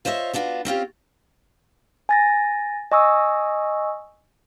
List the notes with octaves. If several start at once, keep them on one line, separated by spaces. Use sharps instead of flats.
F4 C5 C#5 D#5 E5
B3 D4 F4 F#4
C4 C#4 F4 G4
G#5 A6 A#6
D#5 G#5 C#6 D#6 E6